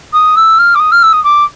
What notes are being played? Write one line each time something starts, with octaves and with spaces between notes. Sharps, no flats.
D#6
E6
F6
D6
D#6
F6
E6
D#6
D6